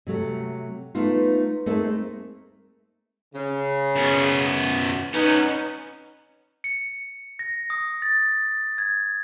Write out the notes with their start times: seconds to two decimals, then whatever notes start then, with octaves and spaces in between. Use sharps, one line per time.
0.07 C3 F#3 A3
0.95 A3 B3 D#4 F4
1.66 A3 A#3 C4 D#4 G#4 A#4
3.34 C#3
3.96 F#2 B3
5.14 B3 C#4 D#4 B4
6.64 C#7
7.39 A#6
7.70 D#6
8.02 A6
8.78 G#6